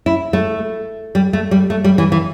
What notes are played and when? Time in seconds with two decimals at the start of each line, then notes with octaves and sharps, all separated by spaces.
0.06 E4
0.33 A3
1.15 G3
1.33 A3
1.51 G3
1.70 A3
1.84 G3
1.98 E3
2.12 E3